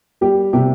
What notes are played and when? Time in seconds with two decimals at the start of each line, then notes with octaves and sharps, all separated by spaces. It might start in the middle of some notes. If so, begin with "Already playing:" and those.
0.21 G3 G4
0.53 C3 G4